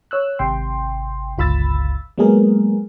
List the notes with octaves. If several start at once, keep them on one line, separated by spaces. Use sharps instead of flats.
C#5 E6 F#6
G#1 C3 G5 C6
G1 C#2 F4 B5 E6 A6
F#3 G#3 A#3 B3 G#4 A#4